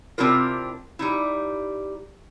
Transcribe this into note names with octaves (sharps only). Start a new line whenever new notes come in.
C3 C4 D4 E4 F4 A#4
G3 D#4 E4